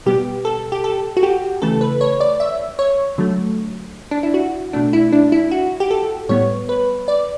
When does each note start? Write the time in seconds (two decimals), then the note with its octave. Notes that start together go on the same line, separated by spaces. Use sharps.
0.06 B2 G3 B3 G4
0.45 A4
0.72 G4
0.84 A4
1.17 F#4
1.23 G4
1.62 C#3 E3 A3 A4
1.81 B4
2.01 C#5
2.20 D5
2.40 E5
2.79 C#5
3.18 D3 F#3 A3
4.11 D4
4.23 E4
4.34 F#4
4.73 B2 A3 D4
4.93 E4
5.12 D4
5.32 E4
5.51 F#4
5.80 G4
5.91 A4
6.29 A2 G3 B3 C#5
6.69 B4
7.08 D5